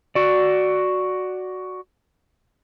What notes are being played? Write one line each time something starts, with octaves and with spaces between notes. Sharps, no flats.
F#4 D5